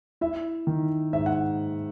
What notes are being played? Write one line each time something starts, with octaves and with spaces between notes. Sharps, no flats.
E4 E5
D#3
G#2 E5
F#5